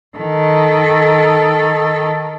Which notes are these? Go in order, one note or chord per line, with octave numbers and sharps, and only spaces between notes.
D#3 A4